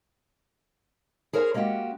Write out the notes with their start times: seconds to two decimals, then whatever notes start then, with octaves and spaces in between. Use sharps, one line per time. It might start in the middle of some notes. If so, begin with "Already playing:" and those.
1.33 G#4 A#4 C5 C#5 E5 G#5
1.54 G#3 A#3 C#4 F#4 G4